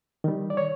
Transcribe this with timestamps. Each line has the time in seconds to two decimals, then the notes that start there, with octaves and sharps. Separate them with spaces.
0.24 D#3 G3
0.50 D5
0.57 C#5